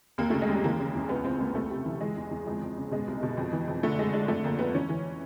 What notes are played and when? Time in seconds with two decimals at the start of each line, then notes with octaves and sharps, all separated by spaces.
0.18 D#2 A#3
0.30 C#3 A3
0.42 G#3
0.49 D#2 G3
0.64 E3 A#3
0.79 C#3
0.95 E2
1.09 C#2 B3
1.25 C#2 C4
1.40 C#2 A#3
1.55 C2 A3
1.70 C3
1.85 E3
2.01 E3 G#3
2.16 E2
2.31 E2
2.46 F2 G#3
2.62 F2
2.77 C#3
2.91 B2 G#3
3.08 C2
3.23 B2
3.37 F2
3.52 E3
3.68 F2
3.83 D3 A3
3.99 D3 G#3
4.14 D3 G#3
4.28 F2 A3
4.44 F2 A#3
4.59 F2 B3
4.74 E3 C#4
4.89 E3